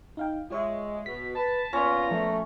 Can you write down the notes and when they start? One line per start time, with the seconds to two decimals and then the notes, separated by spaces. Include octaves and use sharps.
0.17 D#4 F5 G5
0.50 G#3 F4 C#5 E5
1.06 B2 B6
1.35 B4 A5
1.73 A#2 B3 C#4 F4 A#5
2.11 F3 A3